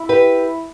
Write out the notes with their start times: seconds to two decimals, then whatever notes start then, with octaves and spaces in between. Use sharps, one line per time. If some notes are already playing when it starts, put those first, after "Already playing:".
Already playing: E4
0.09 G4 B4